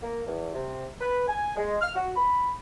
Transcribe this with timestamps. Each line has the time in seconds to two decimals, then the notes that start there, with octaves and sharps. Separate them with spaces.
0.03 A#3
0.26 E2
0.54 C3
1.01 B4
1.28 G#5
1.56 G#3
1.81 F6
1.95 F#4
2.16 B5